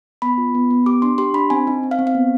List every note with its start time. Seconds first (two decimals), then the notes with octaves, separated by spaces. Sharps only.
0.22 B3 B5
0.38 F4
0.55 B3
0.71 B3
0.86 G4 D6
1.02 D4 C6
1.18 G4 C6
1.34 D4 B5
1.50 C4 G#5
1.67 D#4
1.83 C4
1.91 F5
1.99 C4
2.07 F5
2.15 B3